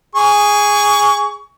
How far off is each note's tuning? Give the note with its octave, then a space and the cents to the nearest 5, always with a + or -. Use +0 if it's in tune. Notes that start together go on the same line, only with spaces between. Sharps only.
G#4 -5 C#6 +25